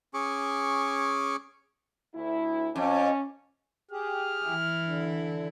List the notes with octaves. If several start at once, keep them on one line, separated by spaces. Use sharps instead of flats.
C#4 G#4 C#6 D6
D2 E4
F2 C#4
G4 G#4 F6
E3 E4
D3